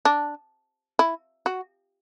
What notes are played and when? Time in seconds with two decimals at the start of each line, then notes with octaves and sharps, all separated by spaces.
0.05 D4
0.99 E4
1.46 F#4